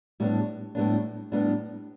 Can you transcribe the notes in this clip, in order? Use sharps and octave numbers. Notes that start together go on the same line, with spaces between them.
A2 G3 B3 D4
A2 G3 B3 D4
A2 G3 B3 D4